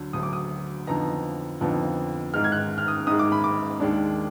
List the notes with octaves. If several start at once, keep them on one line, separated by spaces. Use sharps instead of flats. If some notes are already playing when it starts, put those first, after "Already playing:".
Already playing: D2 D3 F#3
D2 D3 F#3 D#6
D6
D#6
F2 D3 F3 B3 D#4 A#5
F2 D3 F3 B3 D#4
G#2 D#3 G#3 F6
G#6
F#6
F6
D#6
G#2 D#3 G#3 D#6
D6
B5
D6
D#2 D#3 G#3 D4